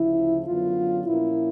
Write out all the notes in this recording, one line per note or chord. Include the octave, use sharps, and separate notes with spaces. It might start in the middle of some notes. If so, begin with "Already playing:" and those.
Already playing: D2 C#3 F3 E4
F#2 D3 F#3 B3 F4
A#2 F3 A#3 C#4 E4